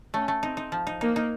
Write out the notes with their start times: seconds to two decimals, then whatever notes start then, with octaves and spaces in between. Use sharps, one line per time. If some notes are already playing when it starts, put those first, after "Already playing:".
0.14 A3 C#4
0.28 A3
0.43 C4 D#4
0.57 D#4
0.72 F3
0.87 D#4
1.01 A#3 D#4
1.16 D#4